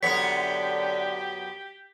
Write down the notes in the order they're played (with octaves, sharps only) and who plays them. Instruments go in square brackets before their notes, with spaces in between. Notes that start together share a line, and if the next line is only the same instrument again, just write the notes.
[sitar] F#2 B3 C#5 [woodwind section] D3 [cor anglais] G4 [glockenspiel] B6